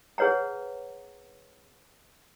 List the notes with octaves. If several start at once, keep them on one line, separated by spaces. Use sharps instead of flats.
G#4 B4 C#5 F#5 A#5